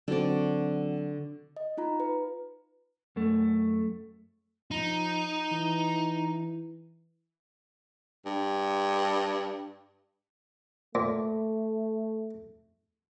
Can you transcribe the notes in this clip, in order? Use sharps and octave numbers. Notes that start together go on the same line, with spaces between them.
D3 F#3 C4 F#4 D5
D#5
D#4 F4 A#5
B4
F#2 A3
F3 D#4
E3
G2
A#2 A3